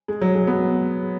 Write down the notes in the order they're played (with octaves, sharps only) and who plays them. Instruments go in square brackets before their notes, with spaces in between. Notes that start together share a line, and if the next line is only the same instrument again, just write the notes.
[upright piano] G#3
F#3
G#3
B3